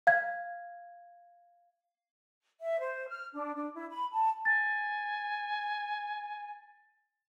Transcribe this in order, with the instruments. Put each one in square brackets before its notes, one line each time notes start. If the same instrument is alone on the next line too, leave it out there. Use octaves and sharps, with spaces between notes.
[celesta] F5 G#6
[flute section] E5
C5
F6
D4
D4
E4
B5
A5
[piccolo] G#5 [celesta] A6